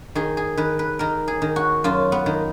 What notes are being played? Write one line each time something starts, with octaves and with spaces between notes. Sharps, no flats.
D#3 G#4
G#4
D#3 B4
B4
D#3 A#4
G#4
D#3
F#4
F#2 F4
B3
D#3